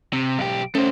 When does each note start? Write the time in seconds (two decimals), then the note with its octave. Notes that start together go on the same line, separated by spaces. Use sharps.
0.13 C3
0.39 B1 G4
0.75 A3 C#4 C5